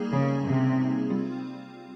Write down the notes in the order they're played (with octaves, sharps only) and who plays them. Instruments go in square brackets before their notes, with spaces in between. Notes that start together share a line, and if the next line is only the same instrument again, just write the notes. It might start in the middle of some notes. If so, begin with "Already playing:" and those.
Already playing: [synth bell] G3 A#3 D#4 G#4
[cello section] C#3
C3
[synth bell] G3 C4 F4